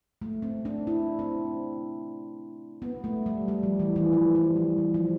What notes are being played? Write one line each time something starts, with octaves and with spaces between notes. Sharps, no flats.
A3
C4
D4
E4
C4
B3
A3
G3
G3
F3
E3
E3
F3
G3
F3
F3
F3